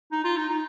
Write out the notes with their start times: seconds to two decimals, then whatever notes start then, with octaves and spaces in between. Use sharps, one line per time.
0.12 D#4
0.24 F4
0.36 D#4
0.49 D#4